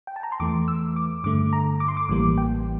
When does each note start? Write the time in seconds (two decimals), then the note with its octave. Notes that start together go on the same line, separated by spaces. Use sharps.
0.07 G5
0.16 A5
0.23 A#5
0.32 C6
0.40 E2 E3 A3 D6
0.68 E6
0.96 D6
1.24 G2 D3 A3 D6
1.53 A#5
1.80 D6
1.88 C6
1.97 D6
2.09 A1 A2 E3 G3 A#3 D6
2.38 G5